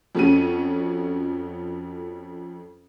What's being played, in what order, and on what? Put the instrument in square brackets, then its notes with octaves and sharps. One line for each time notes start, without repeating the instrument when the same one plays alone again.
[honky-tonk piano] F2 A3 C#4 F#4 D#7